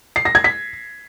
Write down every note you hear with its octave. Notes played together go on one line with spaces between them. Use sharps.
C7
A#6
G#6
B6